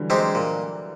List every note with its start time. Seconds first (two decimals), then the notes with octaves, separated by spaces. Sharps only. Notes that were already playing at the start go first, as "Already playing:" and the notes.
Already playing: D3 E3 F#3 G3
0.10 G#3 C4 D#4 G4
0.35 A#2